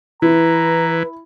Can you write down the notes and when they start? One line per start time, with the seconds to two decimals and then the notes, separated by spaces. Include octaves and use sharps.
0.22 E3 E4 B4 A#5